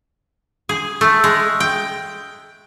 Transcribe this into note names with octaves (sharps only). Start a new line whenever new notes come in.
G#4
A3
G#3
G5